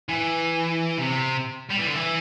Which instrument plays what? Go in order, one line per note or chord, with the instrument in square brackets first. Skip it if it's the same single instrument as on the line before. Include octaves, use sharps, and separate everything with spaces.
[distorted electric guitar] E3
C3
G3
E3
D3
E3